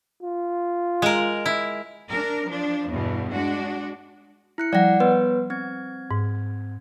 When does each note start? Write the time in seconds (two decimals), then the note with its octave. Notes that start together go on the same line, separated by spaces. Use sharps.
0.23 F4
1.02 G#3 A#4
1.46 E4
2.10 D4 A#4
2.47 F3 D4
2.89 E2 G2 B2
3.34 G#3 D4 F#4
4.58 E4 F#6 C#7
4.73 F3 G3 D5 F#5 A#6
5.00 B3 B4 C#5
5.50 C4 G#6
6.11 G#2